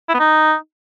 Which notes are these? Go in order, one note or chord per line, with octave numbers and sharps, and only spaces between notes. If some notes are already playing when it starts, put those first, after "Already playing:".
E4
B3
D#4